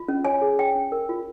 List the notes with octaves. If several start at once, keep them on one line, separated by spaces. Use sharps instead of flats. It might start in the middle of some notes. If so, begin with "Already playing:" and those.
Already playing: F4
C#4
C#5 G#5
G#4
C#5 G5
C#4
A#4
F4